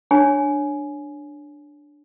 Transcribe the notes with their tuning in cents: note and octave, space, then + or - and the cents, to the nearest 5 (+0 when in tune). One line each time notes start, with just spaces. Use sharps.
D4 +0 C#5 +0 G#5 +10